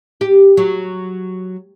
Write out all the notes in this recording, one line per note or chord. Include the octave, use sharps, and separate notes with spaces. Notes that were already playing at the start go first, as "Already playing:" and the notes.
G4
F#3